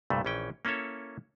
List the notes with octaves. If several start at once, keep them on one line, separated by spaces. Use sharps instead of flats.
C2 G2 A#2 A3
A#1 E3 C#4 G5
A#3 C#4 E4 A4 C#5